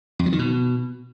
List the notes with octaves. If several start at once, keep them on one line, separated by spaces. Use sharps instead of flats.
F2
F#3
D#3
B2